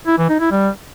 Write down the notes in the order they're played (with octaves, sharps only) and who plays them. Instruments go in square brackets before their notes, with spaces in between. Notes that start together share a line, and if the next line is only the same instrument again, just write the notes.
[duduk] E4
E3
D#4
E4
G3